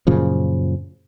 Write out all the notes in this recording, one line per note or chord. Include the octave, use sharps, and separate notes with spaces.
F#2 A#2 C#3 F3